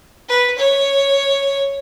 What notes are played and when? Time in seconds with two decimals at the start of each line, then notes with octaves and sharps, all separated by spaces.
0.29 B4
0.58 C#5